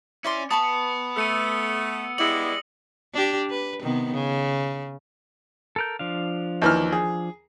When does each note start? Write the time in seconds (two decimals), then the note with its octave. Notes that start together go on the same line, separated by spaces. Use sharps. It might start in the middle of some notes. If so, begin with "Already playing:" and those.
0.24 C#4 E4 D5 C6
0.51 B3 A5 B5 C#6 D#6
1.16 A3 E6 C#7 D#7
2.18 G3 G#3 E4 D5 A#6 C#7 F#7
3.14 D4 G4
3.50 B4
3.82 C3 D#3 B3
4.12 C#3
5.76 A4 A#4 G6
5.99 F3 D4 F5
6.62 D#2 E3 F6
6.93 G#4